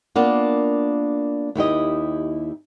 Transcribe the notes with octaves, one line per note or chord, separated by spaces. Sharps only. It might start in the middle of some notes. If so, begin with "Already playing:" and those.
A#3 B3 D4 F4
D#2 E4 G4 D#5